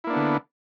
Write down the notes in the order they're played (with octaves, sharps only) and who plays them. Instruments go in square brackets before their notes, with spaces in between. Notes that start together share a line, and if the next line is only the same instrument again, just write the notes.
[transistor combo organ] E4
A#3
D4
B3
D3